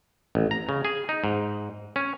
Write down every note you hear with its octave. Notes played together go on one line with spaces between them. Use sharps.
A1
A#5
C#3
G#4
D#4
G#2
C#4